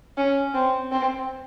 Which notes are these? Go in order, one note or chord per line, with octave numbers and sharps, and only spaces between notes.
C#4
C4
C4